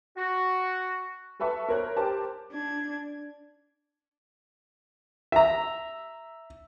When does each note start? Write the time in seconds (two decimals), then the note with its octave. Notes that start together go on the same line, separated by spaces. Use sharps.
0.16 F#4
1.40 A4 B4 E5 A5 C#6
1.69 A#4 C5 C#5 A#5 F#6
1.96 G4 A#4 C5 A5 D6
2.53 D4 G#6
5.32 E5 A#5